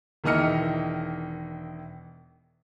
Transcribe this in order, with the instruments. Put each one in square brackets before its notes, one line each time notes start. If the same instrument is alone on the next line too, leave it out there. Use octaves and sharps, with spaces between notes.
[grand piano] E1 D#3 E3 D#5 F6 C#7